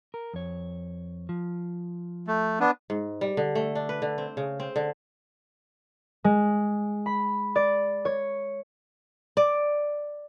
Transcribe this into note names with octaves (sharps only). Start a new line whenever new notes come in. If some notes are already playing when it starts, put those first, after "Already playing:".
A#4
F2 C#5
F3
A3
B3 D4
G#2
G3
D3
A3
D4
B4
D3
C4
C#3
C4
D3
G#3
B5
D5
C#5
D5